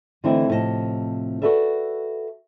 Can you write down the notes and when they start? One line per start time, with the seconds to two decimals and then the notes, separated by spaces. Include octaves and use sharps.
0.24 D3 E3 A3 C4 D#4 E4
0.49 A2 C3 F3 D#4 D#5 A5
1.42 F#4 G4 A4 B4 D5 E5